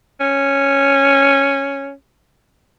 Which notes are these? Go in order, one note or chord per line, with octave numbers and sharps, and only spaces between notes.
C#4